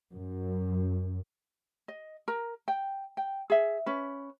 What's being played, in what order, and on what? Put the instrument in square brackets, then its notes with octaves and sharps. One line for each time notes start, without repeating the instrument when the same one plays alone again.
[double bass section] F#2
[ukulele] D#5
A#4 A#5
G5
G5
G#4 E5
C#4 B4